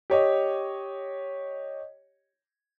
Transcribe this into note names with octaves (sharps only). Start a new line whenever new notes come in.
G4 C#5 D#5